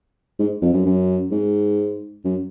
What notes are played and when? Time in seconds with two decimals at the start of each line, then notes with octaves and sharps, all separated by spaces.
0.39 G#2
0.62 F2
0.74 F#2
0.86 F#2
1.31 G#2
2.24 F#2